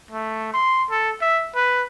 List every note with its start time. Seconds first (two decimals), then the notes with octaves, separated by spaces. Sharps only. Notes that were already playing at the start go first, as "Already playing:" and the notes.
0.11 A3
0.53 C6
0.90 A4
1.21 E5
1.55 B4